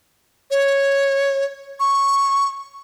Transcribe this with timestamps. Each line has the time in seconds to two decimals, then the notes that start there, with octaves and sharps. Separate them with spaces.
0.51 C#5
1.80 C#6